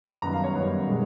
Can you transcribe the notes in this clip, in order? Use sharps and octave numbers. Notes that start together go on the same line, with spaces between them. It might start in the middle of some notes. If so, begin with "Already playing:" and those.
F#2 D#3 G3 B3 A#5
F5
C#5
F#2 D#3 G3 B3
B2 G#3